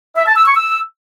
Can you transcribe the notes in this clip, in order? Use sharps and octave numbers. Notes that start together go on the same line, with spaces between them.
E5
A5
E6
C#6
E6